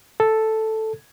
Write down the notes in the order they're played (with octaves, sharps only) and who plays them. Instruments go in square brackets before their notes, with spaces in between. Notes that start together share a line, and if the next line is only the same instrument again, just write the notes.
[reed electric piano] A4